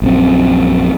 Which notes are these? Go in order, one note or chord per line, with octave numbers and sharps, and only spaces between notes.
A#1 F#2 C4